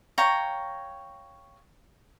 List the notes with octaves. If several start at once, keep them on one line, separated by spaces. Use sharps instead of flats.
C#5 F5 G5 A#5